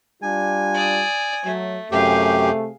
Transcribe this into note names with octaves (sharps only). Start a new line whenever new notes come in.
G3 D4 F4 G#5
D5 D#6
F#3 A3
F#2 C3 A3 G4 G#4 F5 G5